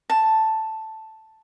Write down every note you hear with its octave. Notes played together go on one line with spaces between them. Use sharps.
A5